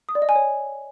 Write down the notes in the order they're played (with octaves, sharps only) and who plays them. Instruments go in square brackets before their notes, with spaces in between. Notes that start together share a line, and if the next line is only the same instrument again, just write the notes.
[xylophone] D#6
D5
D#5
G#5
C#5